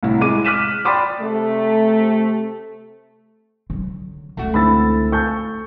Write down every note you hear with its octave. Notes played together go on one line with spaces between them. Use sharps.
C2 A2 E4
G#3 E4 D6 D#7
D6 F6 F#6 B6 D#7 E7
D5 G5 B5 C6 D6 D#6
C3 A3
D3 F#3
C#2 A3 F#4
D3 E3 C4 B5 E6 A6
A4 F5 A5 C#6 G6